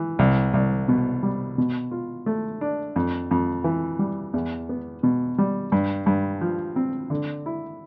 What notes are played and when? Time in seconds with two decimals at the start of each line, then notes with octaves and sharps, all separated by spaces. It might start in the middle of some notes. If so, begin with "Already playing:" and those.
Already playing: E3
0.19 C2
0.54 C2
0.88 B2
1.23 G3
1.58 B2
1.91 F4
2.26 A3
2.61 D4
2.96 F2
3.31 F2
3.64 E3
3.99 G3
4.34 E2
4.69 B3
5.03 B2
5.38 G3
5.72 G2
6.06 G2
6.41 F3
6.76 C4
7.10 D3
7.46 E4